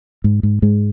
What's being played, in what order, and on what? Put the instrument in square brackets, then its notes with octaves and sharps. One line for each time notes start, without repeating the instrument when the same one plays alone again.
[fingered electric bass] G#2
G#2
G#2 G#3